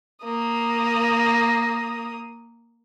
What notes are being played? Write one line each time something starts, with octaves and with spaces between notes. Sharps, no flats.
A#3 D#6